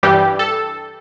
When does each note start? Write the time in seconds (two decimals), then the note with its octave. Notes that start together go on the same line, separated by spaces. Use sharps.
0.03 G2 E3 G3 G4
0.39 A4